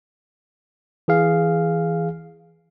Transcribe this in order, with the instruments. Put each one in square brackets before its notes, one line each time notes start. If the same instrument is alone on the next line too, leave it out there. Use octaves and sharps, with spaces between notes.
[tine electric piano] E3 G#4 F5